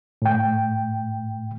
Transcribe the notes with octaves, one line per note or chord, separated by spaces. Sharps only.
A2 G5